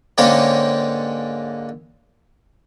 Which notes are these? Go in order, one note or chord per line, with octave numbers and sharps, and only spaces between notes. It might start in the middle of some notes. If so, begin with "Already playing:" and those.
G#2 D3 A#3 C#4 G4 C#5